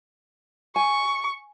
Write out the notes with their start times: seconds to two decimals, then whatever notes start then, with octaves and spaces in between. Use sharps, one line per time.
0.76 G#5 C#6